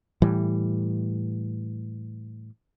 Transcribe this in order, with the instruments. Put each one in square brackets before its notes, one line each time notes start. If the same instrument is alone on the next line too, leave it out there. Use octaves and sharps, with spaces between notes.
[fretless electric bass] A2 E3 G3